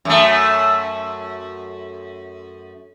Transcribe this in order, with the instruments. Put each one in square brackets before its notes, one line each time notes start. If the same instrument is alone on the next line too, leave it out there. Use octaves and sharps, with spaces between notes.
[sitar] F#2 A3